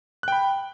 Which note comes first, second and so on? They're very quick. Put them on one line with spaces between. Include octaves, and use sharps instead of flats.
F#6 G5 B5